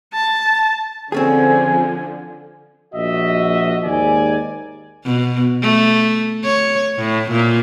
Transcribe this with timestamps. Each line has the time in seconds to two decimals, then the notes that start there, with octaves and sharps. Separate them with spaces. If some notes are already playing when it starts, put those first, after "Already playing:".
0.14 A5
1.12 D3 F3 C4 C#4 G#4 G#5
2.94 A#1 F#4 D#5 E5
3.84 D#2 G#2 D5 G#5
5.05 B2
5.63 A3
6.45 C#5
6.98 A2
7.32 A#2